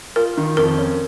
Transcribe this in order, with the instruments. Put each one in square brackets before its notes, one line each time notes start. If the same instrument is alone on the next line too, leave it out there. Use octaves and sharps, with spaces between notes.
[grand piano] F4 [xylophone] A#4
[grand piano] D#3
[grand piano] F2 [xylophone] A#4
[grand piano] C#4